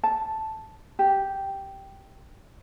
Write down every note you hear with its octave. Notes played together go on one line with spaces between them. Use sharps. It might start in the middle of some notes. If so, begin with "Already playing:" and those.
A5
G4